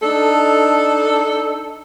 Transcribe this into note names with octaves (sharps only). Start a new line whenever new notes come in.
D4 D#4 A4